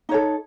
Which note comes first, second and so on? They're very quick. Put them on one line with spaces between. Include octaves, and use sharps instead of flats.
D#4 C#5 A4